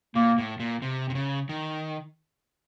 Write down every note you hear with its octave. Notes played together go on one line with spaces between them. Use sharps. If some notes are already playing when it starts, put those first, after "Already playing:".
A#2 A#3
A2
A#2
C3
C3
C#3
D#3